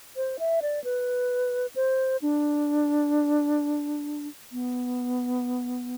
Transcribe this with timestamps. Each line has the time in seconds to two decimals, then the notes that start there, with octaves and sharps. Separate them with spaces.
0.17 C5
0.39 E5
0.62 D5
0.84 B4
1.76 C5
2.22 D4
4.52 B3